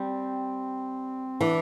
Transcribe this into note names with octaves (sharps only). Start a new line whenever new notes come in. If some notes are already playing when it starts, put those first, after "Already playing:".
Already playing: G3 C4
E3 D4